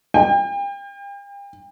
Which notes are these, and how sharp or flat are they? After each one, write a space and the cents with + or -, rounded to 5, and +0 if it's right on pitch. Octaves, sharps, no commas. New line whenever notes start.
G5 +35